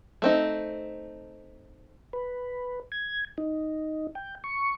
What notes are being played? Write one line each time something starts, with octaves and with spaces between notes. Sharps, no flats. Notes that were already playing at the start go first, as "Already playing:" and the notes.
A3 C4 D#4
B4
G#6
D#4
G5
C#6